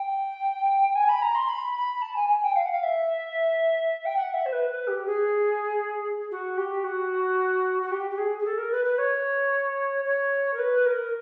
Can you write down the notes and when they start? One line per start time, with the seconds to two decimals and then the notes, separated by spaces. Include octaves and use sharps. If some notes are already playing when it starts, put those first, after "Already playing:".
Already playing: G5
0.95 G#5
1.08 B5
1.21 A#5
1.34 C6
1.48 B5
1.76 B5
2.01 A5
2.16 G#5
2.28 G#5
2.42 G5
2.55 F5
2.64 F#5
2.71 F5
2.83 E5
4.05 G5
4.16 F#5
4.33 E5
4.45 C5
4.52 B4
4.69 B4
4.87 G4
5.05 G#4
6.31 F#4
6.57 G4
6.83 F#4
7.82 F#4
7.91 G4
8.10 G4
8.17 G#4
8.38 G#4
8.44 A4
8.57 A#4
8.71 B4
8.84 B4
8.98 C#5
10.04 C#5
10.53 A#4
10.58 B4
10.86 A#4